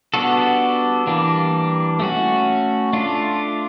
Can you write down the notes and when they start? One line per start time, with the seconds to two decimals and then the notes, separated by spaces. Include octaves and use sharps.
0.14 G3 B3 D4 F#4 A4
1.07 E3 G3 A#3 D4
2.00 A3 C#4 F#4
2.93 A3 D4 F4